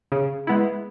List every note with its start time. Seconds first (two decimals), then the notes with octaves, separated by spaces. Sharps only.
0.12 C#3
0.47 G#3 B3 E4